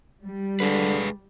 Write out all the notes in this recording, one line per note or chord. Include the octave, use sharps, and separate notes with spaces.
G3
D3 G#3 G#4 B4